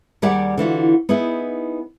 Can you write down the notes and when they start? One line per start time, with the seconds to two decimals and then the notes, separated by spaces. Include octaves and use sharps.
0.22 D#2 G3 G4 G#4 D5 F#5
0.57 D3 E3 F4 F#4
1.09 B3 D#4 E4 G#4 B4